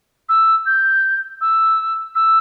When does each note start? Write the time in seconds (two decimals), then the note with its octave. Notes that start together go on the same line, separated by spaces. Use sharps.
0.29 E6
0.66 G6
1.41 E6
2.15 E6